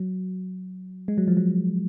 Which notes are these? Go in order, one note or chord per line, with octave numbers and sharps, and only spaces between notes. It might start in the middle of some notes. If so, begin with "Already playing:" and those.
Already playing: F#3
G#3
F#3
F3
F#3